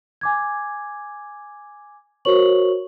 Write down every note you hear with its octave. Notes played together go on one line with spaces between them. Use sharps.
G#5 D6 G#6
F#4 A#4 C5 C#5 C#6 F#7